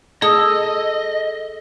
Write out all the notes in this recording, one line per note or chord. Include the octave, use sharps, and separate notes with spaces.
G#4 A4 D#5 D#6